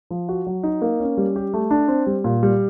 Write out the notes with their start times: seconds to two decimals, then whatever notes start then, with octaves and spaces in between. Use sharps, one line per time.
0.11 F3
0.29 F#4
0.47 F#3
0.63 D#4
0.82 A#3
1.00 C#4
1.17 G3
1.36 G4
1.54 A3
1.71 D4
1.88 C4
2.07 G3
2.24 A#2
2.43 G3